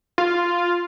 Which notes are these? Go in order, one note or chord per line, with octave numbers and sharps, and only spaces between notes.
F4